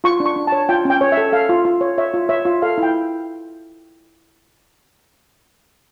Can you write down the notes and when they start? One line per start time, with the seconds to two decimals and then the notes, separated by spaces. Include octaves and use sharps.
0.04 F4 C#6
0.20 D4
0.26 C#6
0.36 D4
0.47 C#5 A5
0.69 F4 G5
0.85 C#4 G5
1.01 C#5
1.12 E5
1.17 A4
1.33 A4 F5
1.49 F4
1.65 F4
1.81 C#5
1.98 C#5 E5
2.14 F4
2.29 C#5 E5
2.45 F4
2.62 A4 F5
2.78 E4 G5